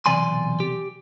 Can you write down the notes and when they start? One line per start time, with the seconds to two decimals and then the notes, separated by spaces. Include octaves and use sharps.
0.06 B1 C3 E3 D5 G#5 C6
0.60 G4